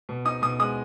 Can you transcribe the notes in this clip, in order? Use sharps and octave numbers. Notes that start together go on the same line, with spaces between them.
B2
D#4 D#6
B2 D#6
G#3 D#6